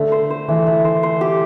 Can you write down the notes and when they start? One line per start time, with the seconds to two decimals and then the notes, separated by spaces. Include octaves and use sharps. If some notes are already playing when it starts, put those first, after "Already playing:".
Already playing: D3 A3
0.12 C5
0.30 C5
0.48 E3 A3
0.67 A3
0.85 C5
1.03 C5
1.21 G4